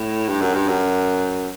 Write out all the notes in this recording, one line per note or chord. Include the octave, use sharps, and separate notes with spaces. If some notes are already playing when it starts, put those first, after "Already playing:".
Already playing: A2
G2
F#2
G2
F#2